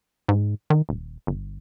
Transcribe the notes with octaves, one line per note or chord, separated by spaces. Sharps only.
G#2
D#3
D#1
G1